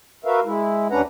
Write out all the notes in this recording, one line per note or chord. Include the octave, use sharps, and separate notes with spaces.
F#4 A#4 B4 E5 F5
G#3 E4
D#2 C#4 D4 B4 F#5 A#5